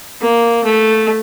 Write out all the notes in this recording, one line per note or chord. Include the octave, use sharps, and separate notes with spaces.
A#3
A3